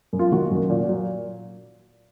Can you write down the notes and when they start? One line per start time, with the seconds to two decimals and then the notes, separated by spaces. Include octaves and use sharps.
0.13 F#2
0.19 F4
0.32 D#3 F#4
0.51 F#2
0.70 A#2
0.89 F#3